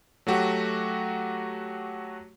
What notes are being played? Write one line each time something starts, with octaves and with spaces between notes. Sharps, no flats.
F#3 A3 F#4 G4